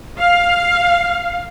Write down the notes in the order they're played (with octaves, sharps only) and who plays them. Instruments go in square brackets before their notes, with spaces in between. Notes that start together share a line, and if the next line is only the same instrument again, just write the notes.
[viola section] F5